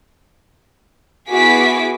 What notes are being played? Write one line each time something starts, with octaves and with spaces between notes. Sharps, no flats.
B3 E4 F#4 G#4 D6 B6